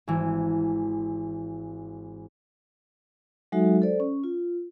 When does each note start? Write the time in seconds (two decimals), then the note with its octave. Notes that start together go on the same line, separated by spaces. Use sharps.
0.08 G#1 E3
3.52 F#3 G#3 D#4 F#4 A4 E5
3.82 A4 C5 D5
4.00 C#4
4.24 F4